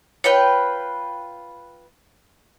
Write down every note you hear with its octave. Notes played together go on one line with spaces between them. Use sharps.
F4 B4 C#5 G5